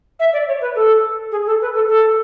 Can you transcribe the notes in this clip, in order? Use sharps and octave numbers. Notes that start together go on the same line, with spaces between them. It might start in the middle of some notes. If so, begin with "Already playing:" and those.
E5
D5
C#5
B4
A4
G#4
A4
B4
A4
A4